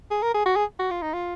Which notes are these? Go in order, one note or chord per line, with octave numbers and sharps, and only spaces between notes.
G#4
A#4
G#4
F#4
G#4
F#4
F4
D#4
F4